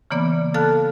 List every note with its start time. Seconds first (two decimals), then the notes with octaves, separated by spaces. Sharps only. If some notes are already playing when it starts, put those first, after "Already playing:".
0.11 C#3 E3 A#3 B3 D5 D6
0.54 A4 F5 A5 F6 F#6